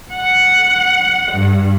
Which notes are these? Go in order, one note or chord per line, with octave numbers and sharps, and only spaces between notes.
F#5
G2